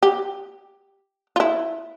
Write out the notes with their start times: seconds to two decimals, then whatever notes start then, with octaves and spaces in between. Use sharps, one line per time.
0.03 G4
1.36 F4
1.40 E4